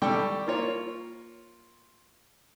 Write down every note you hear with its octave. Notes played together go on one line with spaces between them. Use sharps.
G3 A4 D5 G5 C#6
A#3 F4 C#5